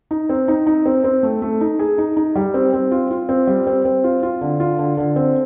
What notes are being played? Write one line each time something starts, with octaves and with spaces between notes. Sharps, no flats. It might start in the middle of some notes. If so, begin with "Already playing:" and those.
D#4
C4
D#4
D#4
C4
C4
A3
A3
D#4
G#4
D#4
D#4
G3
C4
C4
F4
F4
C4
G3
C4
C4
F4
F4
D3
F4
D3
D3
C4